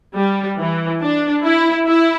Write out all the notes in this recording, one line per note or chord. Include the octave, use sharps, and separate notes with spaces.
G3
E3
D4
E4
E4